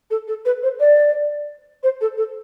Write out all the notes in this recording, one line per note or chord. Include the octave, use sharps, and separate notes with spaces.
A4
A4
B4
C5
D5
C5
A4
A4